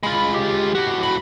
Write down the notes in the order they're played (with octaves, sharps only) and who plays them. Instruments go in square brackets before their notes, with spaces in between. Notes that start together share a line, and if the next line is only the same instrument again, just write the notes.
[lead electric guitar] G#3 F4 [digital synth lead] B5
[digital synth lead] G4
[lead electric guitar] A2 F#4 [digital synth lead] G4
[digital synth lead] B5